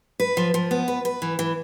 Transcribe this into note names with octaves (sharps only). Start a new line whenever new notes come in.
B4
F3
F3
B3
B4
B4
E3
E3